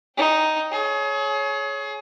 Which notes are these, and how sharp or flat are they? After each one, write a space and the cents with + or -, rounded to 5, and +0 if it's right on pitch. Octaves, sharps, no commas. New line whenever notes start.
D#4 +0 G5 +0
G#4 +35 C#5 +0